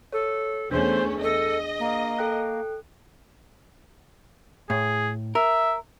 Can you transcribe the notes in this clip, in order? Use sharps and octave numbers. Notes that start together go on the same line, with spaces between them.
A4 C#5
E2 A3 C#4 D4 G#4 C5
A4 D#5
A#3
A4 G5 F#6
A2 G#4
A#4 E5